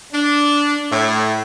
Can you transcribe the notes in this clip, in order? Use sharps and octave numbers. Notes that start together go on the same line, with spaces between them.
D4
A2